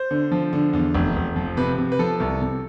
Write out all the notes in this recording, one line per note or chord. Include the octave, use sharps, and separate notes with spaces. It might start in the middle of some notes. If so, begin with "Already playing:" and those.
Already playing: C5
D3
F3
D3
E2
F1
F1
F3
C3 B4
C3
B4
F3 A4
C2
C3